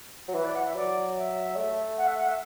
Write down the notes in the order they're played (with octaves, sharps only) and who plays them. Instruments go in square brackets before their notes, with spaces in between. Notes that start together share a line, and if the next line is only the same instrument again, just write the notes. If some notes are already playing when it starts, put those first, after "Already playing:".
[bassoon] F#3
[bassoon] E3 [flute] B4
[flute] D5
F#5
E5
[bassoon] F#3 [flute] D5
[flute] E5
[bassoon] A3
[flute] F#5
E5
F#5
E5